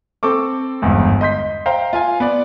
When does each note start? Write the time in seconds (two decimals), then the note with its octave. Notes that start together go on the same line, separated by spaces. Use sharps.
0.23 C4 A4 C#6 D6
0.82 G1 E2 G#2
1.21 D#5 C6 G6 B6
1.66 C5 F5 G5 A#5
1.93 F4 F5 G#5
2.20 B3 D5